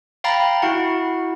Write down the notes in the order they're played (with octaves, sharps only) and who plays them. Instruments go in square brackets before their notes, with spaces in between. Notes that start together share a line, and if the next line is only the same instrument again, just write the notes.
[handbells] F5 G5 A#5 B5 A6
E4 F#4 F#5